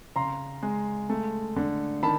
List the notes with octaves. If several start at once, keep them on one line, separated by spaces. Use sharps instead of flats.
C#3 A#5 C6
G#3
A3
D3
D#3 A5 B5